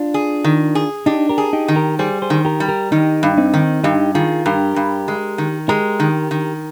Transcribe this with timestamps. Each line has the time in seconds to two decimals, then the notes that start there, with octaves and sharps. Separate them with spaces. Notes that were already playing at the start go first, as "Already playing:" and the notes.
Already playing: D4 F4
0.14 G#4
0.44 D#3
0.75 G#4
1.06 D4 D#4 G4
1.29 G4 A#4
1.38 G#4
1.53 D#4 G4
1.68 D#3
1.76 G4 A#4
1.99 G3 G#4 C5
2.22 G#4 C5
2.30 D#3
2.45 G4 A#4
2.60 G3
2.69 G4 A#4
2.92 D#3 D#4 G4
3.23 G2
3.38 C4 D#4
3.54 D#3
3.84 G2 D#4 G4
4.15 D#3 F4 G#4
4.46 G2 G4 A#4
4.76 G2
5.08 G#3
5.38 D#3
5.69 G#3 G4 A#4
6.00 D#3
6.31 D#3